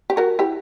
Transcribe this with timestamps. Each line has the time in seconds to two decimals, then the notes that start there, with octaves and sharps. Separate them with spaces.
0.10 G4
0.17 F#4 A#4
0.39 E4 G4